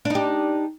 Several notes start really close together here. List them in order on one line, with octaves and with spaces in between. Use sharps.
D4 D#4 G4